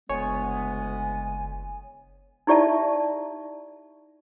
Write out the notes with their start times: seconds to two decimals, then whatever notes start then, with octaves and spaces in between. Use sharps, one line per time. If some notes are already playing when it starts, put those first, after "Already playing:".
0.10 F#1 D2 G#3 B3 C#5 G#5
2.47 D#4 E4 G4 D5 E5 A5